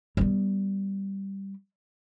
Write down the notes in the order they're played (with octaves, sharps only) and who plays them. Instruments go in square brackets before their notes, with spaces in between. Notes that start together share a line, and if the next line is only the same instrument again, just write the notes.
[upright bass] G3 B3